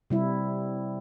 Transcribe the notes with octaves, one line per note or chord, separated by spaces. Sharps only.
C3 G3 E4